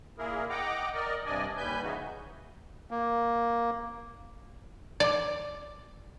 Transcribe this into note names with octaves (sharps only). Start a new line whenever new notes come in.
A#2 A#3 E4 G#4 A#4
D#5 F#5 G5 A#5 D6
A#4 D5 D#5
G2 C3 D4 D5 D#5 G#5
D#2 G3 B4 G#5 G6
C#3 E3 D#4 F#4
A#3
D5